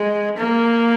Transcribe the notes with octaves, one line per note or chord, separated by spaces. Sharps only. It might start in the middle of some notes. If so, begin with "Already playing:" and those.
Already playing: G#3
A#3